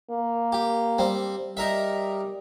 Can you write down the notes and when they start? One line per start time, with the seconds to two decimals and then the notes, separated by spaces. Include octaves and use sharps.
0.11 A#3
0.52 G4
0.98 G3 C4
1.57 G3 D#4 A#4 E5